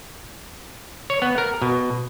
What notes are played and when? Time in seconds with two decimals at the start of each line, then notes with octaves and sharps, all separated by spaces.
1.10 C#5
1.22 B3
1.38 A#4
1.62 B2